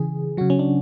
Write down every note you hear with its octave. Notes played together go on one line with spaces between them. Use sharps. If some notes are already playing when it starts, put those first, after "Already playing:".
Already playing: C#3 E3 G#4
C#3 F#3 F#4
C#4
D4